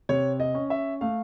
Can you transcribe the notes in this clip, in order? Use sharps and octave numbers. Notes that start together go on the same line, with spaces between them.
C3 C#5
D#5
C#4
E5
A3 F5